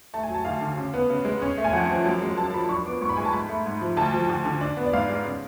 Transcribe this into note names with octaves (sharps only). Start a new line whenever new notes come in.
A3 A5
G#5
F#3
A5
D2 F5
D3
C#3
B3
C#3
G#3
C#4
A3
G#5
F2 F#5
F3
F#2
G#3
F#2 A5
F3 B5
D4 C#6
B3 D6
G#2 C#6
B5
G#3 G#5
A5
G#2 B5
A3
G#2
F3
D2 A5
F3
D2
D3
D4
B3
D5
G#2 F5
G#3
C#3